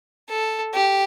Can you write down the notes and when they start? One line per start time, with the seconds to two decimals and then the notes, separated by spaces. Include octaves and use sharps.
0.29 A4
0.74 G4